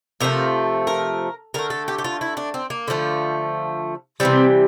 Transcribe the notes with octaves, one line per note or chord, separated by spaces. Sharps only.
C3 F3 A3 A#4
A#4
D3 A3 A#4
A4
G4
G4
F4
E4
D4
C4
A#3
D3 F3 A3
C3 E3 G3 C4